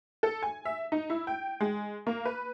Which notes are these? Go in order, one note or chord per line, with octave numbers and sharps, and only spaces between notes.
A4
G#5
E5
D#4
E4
G5
G#3
A#3
B4